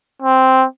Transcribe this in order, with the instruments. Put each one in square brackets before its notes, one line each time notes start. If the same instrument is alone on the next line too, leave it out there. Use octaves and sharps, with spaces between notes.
[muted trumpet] C4